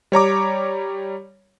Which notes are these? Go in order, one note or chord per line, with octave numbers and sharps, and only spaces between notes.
G3 C#5 A#5 D6